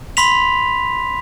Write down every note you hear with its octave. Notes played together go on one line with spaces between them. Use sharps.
B5 C6 B6 F7